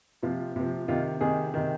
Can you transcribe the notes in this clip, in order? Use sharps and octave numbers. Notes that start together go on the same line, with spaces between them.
C3 F3 F4
C3 F3
C3 D#3 F4
C3 D#3 G#4
C3 D#3